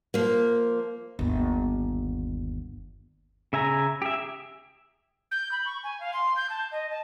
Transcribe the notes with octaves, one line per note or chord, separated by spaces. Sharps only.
F3 A#3
G1 D#2
C#3 E5 G#5 A#5
G4 G#4 E5
G6
B5
C#6
G#5
F5
C6
G6
A5
D#5
A5